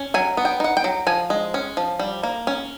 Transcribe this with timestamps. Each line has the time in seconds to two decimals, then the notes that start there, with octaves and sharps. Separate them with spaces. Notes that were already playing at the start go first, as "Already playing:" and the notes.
Already playing: C#4
0.14 F#3 G#5
0.37 B3
0.45 G5
0.60 D#4 F#5
0.77 G5
0.84 F#3
1.07 F3 G#5
1.30 G#3
1.54 C#4
1.77 F3
1.99 G3
2.23 A#3
2.47 C#4